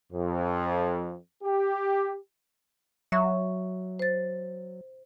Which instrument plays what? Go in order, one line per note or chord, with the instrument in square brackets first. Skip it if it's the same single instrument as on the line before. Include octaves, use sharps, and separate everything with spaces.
[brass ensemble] F2
G4
[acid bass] F#3 [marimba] E5 C#6
[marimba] C5 A6